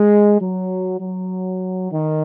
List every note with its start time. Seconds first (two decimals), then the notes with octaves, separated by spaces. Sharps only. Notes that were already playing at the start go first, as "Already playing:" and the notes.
Already playing: G#3
0.39 F#3
1.00 F#3
1.91 D#3